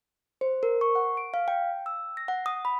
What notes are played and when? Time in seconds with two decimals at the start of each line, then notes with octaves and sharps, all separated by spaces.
0.41 C5
0.63 A#4
0.81 C#6
0.95 F#5
1.17 D7
1.34 F5
1.48 G5
1.86 E6
2.17 A#6
2.28 F#5
2.46 D#6
2.65 B5